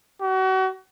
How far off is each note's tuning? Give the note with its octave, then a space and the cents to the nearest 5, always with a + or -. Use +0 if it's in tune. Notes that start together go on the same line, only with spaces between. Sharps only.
F#4 +35